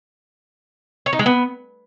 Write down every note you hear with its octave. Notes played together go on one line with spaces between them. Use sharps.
C#5
D#4
G#3
B3